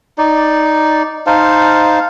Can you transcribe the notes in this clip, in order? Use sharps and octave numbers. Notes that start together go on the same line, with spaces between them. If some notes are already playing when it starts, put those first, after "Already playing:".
D#4 D5
D#4 C5 F5 A5